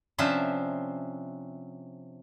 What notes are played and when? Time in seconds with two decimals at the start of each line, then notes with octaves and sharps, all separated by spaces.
0.18 C3 F3 C#4 D4 C5 E5